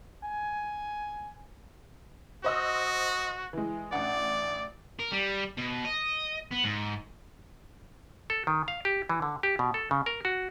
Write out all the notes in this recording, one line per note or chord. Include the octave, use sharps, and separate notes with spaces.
G#5
F#4 C5 D#5 E6
E3 G#3
A1 D4 D5 F#5
A#4
G3
B2
D#5
B3
G#2
A4
D#3
F5
G4
E3
D3
G4
B2
A4
C#3
A#4
F#4